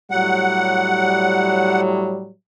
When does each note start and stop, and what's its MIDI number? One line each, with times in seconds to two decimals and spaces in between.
0.11 2.31 45
0.11 2.31 54
0.11 2.31 55
0.11 1.81 78